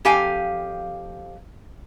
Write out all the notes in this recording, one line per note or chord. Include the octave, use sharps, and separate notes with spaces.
F2 G4 F5 G#5